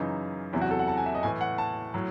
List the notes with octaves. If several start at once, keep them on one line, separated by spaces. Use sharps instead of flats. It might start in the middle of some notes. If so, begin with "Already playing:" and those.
Already playing: F#2 C#3 E3 D#4
E2 C3 F#3 E4
F#4
A4
F#5
A5
G#5
E5
D#5
A2 E3 G#5
F#5
A5
A2 F#3